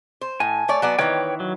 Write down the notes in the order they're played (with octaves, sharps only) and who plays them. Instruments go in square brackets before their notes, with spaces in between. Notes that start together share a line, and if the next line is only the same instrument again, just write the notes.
[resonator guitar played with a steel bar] C5
[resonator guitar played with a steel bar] A2 [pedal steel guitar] G#5
[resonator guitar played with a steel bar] A3 C#5 D5
F#3 B3 D5
[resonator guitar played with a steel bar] D#3 E3 [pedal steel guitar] B4 C#5 G5
[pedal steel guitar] F#3